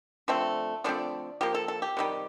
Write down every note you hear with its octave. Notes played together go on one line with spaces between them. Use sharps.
D3 F3 A3 C4
D3 F3 A3 C4 D5
F3 A#3 G4
A4
A4
G4
C3 D#3 G3